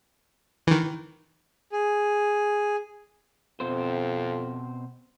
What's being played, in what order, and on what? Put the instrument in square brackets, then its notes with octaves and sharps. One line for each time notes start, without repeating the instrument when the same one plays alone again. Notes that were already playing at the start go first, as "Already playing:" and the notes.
[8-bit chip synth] D#3 E3
[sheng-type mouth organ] G#4
[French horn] F2 [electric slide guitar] B2 C4 C5